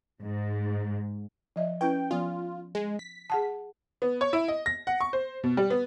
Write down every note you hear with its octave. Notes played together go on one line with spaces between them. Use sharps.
G#2
F3 D#5 E5
C#4 E4 B4 G5
F3 B3 F4
G#3
B6
G#4 F#5 A5
B3
C#5
E4
D#5
A#6
F#5
C#6
C5
B2
G3
B3